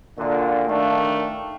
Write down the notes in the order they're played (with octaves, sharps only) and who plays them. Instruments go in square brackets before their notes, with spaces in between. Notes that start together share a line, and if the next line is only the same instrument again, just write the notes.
[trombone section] A#2 D3 [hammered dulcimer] F#4 F5
[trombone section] D#3 D4 [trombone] A3 [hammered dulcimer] A4 F5 G5
[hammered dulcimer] G5